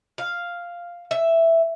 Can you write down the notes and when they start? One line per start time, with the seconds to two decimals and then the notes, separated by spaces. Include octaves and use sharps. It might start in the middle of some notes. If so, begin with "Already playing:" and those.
0.18 F5
1.11 E5